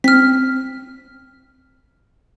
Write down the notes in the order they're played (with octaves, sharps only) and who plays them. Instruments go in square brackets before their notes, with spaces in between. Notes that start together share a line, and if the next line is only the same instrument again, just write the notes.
[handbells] C4 [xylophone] F6 B6